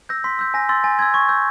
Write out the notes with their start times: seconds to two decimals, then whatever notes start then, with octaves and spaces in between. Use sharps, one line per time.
0.09 E6 G6 A#6
0.24 C6 B6
0.39 E6 G6
0.54 G#5 A#6
0.69 C6 E6 A6
0.84 G#5 A6
0.99 C6 E6 G#6
1.14 C#6 G#6
1.29 E6 G6